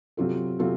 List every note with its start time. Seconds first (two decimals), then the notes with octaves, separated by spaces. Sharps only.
0.17 C3 F#3 C4 F4 A4
0.59 C3 F#3 C4 F4 A4